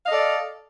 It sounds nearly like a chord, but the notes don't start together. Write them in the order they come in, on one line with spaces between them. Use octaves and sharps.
F5 D#5 A4 D5